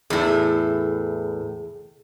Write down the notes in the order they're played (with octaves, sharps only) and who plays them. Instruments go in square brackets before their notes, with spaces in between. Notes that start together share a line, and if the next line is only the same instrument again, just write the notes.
[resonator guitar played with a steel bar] E2 A2 [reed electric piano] G#4